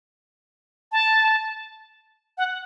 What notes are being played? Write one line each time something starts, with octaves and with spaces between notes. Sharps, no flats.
A5
F#5